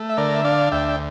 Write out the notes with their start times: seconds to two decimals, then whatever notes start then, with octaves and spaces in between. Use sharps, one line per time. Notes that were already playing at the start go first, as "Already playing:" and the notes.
Already playing: A3
0.09 E5
0.17 D3 A#4 D5
0.34 E5
0.45 D4 D5 F5
0.72 D2 E5 G5
0.88 G5